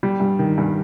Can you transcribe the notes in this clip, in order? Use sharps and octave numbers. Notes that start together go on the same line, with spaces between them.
G3
G2
D#3
G2